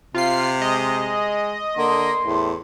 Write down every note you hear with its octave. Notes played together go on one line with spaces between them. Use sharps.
C3 F4 C7
G#3 D#5
D3 A#3 C6
E2 A2